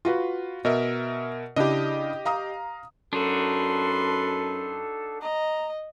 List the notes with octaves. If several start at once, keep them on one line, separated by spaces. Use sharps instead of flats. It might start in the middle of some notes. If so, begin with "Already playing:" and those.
F4 F#4 B4
B2 A#4 D#5 E5
C#3 D4 E4 G4 D#5
F5 A#5 D#6
F#2 D4 D#4 F#4 A4 B4 C6
D#5 A#5